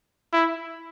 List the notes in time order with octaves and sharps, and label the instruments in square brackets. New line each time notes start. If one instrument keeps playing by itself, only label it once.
[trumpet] E4